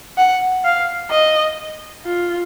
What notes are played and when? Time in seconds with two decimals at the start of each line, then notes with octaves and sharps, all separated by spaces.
0.18 F#5
0.65 F5
1.11 D#5
2.05 F4